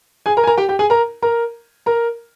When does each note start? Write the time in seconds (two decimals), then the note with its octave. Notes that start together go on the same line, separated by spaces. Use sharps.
0.26 G#4 G#5
0.37 A#4 A#5
0.44 G#5
0.47 A#4 A#5
0.58 G4 G5
0.69 G4 G5
0.79 G#4 G#5
0.90 A#4 A#5
1.22 A#4 A#5
1.86 A#4 A#5